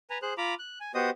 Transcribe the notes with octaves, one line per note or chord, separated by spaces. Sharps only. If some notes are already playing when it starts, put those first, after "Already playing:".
B4 G#5 A#5
G#4 C5 F#6
F4 A#5 B5 D6
F#6
G#5
B3 F#4 G4 C5 D#5 D#6